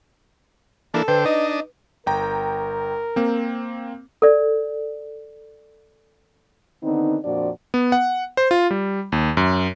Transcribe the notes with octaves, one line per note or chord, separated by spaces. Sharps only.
E3 A#3 D4 A4
D3 B4 C5 G5
D4 D#4 D#5
G1 A#4 G5 A#5
A#3 C4
A4 D5
D3 D#3 B3 C4 D#4
F2 A#2 F3 D4 F#4 D5
B3
F#5
C5
F4
G3
D#2
F#2